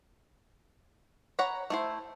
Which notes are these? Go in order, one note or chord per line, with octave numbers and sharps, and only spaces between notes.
C#5 F#5 A#5 B5
A3 E4 C5